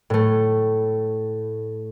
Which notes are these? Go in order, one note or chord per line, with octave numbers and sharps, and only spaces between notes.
A2 A3